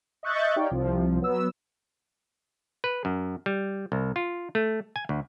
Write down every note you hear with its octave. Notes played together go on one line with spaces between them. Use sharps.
D#5 E5 C#6 F#6 G6 A6
D#4 G4 C#5 D5 F5 G5
C2 C3 F3
F#3 B3 E6
B4
F#2
G3
C2
F4
A3
G#5
D2